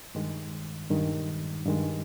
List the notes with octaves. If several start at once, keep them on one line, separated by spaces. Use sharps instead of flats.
G2 D#3 G#3
G2 D#3 G#3
G2 D#3 G#3